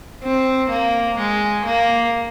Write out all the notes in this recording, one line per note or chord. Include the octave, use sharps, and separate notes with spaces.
C4
A#3
G#3
A#3